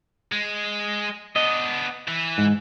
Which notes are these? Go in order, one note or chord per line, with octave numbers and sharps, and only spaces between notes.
G#3
B3 D4 D#5
E3
G#2